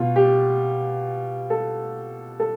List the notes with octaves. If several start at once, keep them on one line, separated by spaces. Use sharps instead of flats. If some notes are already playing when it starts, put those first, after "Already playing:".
Already playing: B2 F4
G4
A4
A4